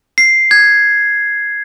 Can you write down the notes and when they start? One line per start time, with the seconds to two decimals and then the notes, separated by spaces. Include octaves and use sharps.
0.18 C7
0.51 G#6